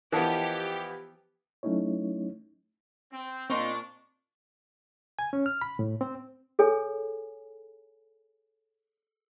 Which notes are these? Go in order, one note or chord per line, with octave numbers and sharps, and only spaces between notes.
E3 F3 B3 G4 A#4 D#5 A5
F#3 A3 C#4 D#4 E4 C#5
C4
A#2 A#3 C4 D4 D#4 C6 C#6
G#5
C#4
F6
B5
A2
C4
G#4 A4 C#5 G#5